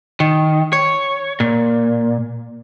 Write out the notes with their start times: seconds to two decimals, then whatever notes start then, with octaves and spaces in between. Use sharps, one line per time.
0.20 D#3
0.73 C#5
1.40 A#2